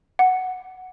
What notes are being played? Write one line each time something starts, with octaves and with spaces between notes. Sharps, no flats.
F#5